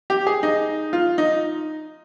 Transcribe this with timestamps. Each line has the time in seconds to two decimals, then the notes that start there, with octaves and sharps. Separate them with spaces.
0.10 G4
0.27 G#4
0.43 D#4
0.93 F4
1.18 D#4